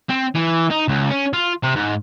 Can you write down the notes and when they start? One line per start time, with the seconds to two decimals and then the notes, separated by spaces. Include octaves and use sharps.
0.10 C4
0.35 E3
0.71 D#4
0.88 C#2
1.10 C#4
1.33 F4
1.63 C3
1.76 G#2